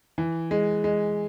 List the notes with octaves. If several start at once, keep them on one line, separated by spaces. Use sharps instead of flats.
E3
G#3
G#3